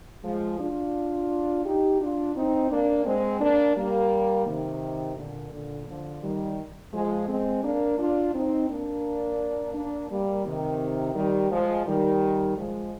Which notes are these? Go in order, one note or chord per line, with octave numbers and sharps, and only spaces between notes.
F3 G#3
D4 F4
D#4 G4
D4 F4
C4 D#4
A#3 D4
G#3 C4
A#3 D4
G3 A#3
C3 D#3
A#2 D3
A#2 D3
D3 F3
D#3 G3
F3 G#3
G#3 C4
A#3 D4
D4 F4
C4 D#4
A#3 D4
A#3 D4
G3 A#3
C3 D#3
D#3 G3
F3 G#3
D#3 G3
F3 G#3